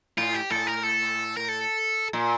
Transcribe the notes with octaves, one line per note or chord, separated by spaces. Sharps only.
A2 F4
G4
A2 A4
A#4
A4
A#4
A4
A#2